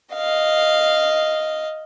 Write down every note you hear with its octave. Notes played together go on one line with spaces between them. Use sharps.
D#5 F5